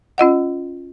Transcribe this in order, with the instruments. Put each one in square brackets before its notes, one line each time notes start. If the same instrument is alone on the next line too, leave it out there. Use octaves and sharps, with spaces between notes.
[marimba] C#4 F4 D#5 F#5